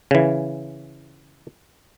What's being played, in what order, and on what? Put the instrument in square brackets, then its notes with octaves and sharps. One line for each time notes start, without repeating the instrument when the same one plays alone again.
[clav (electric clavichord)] C#3 E3